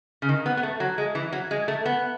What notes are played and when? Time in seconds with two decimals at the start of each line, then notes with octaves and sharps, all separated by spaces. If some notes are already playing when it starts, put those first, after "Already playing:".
0.22 C#3
0.29 D#3
0.46 B3
0.57 B3
0.63 A3
0.80 F#3
0.98 G#3
1.15 E3
1.32 F#3
1.51 G#3
1.68 A3
1.86 B3